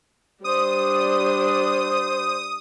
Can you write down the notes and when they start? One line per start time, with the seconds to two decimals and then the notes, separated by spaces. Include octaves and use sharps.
0.44 G3 D4 C5 D#6